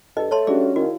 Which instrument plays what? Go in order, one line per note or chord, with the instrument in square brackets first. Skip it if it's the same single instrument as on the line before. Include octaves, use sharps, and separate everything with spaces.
[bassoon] G2 [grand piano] A4 [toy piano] D#5
[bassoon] A3 [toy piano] C#5 A5 C6
[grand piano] G3 D4 F#4 [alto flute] C#4 [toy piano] G#4 D5
[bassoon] D#3 [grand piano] E4 F5 [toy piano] F#4